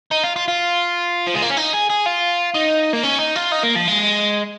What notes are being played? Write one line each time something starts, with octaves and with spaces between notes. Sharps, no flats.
D#4
F4
F4
F4
F3
G#3
A#3
C#4
D#4
G#4
G#4
F4
D#4
A#3
C#4
D#4
F4
D#4
A#3
F3
G#3